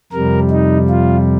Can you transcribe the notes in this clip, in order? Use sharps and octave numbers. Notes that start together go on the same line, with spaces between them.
F2 C3 G3 A#4
D#4
F4